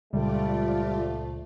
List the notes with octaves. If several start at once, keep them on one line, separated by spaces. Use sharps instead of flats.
C#2 A#2 F3 G3 A3 F4 D5